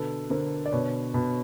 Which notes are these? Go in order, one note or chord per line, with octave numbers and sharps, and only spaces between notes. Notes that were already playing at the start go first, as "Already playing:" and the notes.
Already playing: B2 D3 A4 B4
D3 A#4 C5
D5
B2 B4 C#5
B2